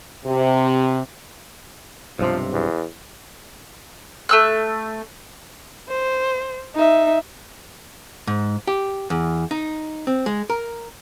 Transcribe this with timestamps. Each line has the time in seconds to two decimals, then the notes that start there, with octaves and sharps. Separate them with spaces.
0.24 C3
2.19 B1 G2 C3 F3
2.52 E2
4.29 A3 E6 F#6
5.89 C5
6.75 D#4 E5
8.27 G#2
8.67 G4
9.10 E2
9.51 D#4
10.07 C4
10.26 G#3
10.50 A#4